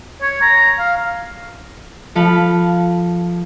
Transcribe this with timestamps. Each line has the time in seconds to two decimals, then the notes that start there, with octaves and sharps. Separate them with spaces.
0.22 C#5
0.42 A#5
0.79 F5
2.15 F3 A4 F5 B5 F#6